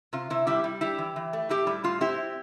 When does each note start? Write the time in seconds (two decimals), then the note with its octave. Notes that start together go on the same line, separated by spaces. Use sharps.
0.13 C3 F4
0.30 C3 E4
0.47 G3 E4 G4
0.64 G3
0.81 D4 E4 G4
0.98 E3
1.16 E3
1.33 A3
1.49 A2 E4 G4
1.67 G3 E4
1.84 A2 F4
2.01 C4 E4 G4